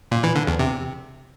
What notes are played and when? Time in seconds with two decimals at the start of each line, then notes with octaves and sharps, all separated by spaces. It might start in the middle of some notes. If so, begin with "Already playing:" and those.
0.11 A#2
0.23 E3
0.35 D3
0.47 E2
0.59 C3